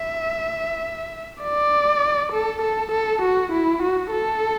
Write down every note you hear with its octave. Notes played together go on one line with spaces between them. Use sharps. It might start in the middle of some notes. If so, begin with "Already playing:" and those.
Already playing: E5
D5
A4
A4
A4
F#4
E4
F#4
A4